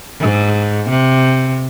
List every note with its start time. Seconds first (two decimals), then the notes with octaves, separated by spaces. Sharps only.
0.20 G#2
0.89 C3